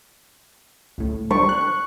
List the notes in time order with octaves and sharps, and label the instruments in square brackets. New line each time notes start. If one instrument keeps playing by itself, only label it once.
[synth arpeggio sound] C#2 A2
[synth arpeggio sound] G3 D4 [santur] C#6
[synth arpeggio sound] F#6